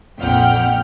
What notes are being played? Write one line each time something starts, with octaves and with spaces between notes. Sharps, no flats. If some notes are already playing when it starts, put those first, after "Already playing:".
A#1 F2 F#5 G5 F6 G6